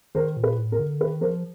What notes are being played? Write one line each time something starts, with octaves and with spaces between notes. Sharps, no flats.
D#3 A#4 C5
A#2
B4
A2
A#4
D3
D#3 B4
F3 A#4 C5